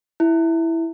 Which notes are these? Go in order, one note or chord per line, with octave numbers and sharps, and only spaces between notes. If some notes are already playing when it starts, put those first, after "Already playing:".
E4